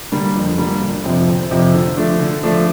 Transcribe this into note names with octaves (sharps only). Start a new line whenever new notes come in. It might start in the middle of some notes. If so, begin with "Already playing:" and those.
D3 G3 A#3 D4
F2
D3 G3 A#3 D4
G1
F2 C3 F3 C4
G1
F2 C3 F3 C4
D3
F3 A3 D4
D3
F3 A3 D4